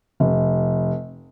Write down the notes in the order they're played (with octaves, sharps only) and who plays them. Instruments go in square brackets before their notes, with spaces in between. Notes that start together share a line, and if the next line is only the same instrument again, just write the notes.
[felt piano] F1